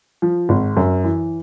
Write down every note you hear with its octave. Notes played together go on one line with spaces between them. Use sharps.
F3
G#1
F#2
E3